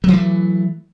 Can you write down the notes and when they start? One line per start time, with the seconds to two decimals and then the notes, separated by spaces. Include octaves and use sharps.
0.04 F#3
0.08 E3
0.13 A3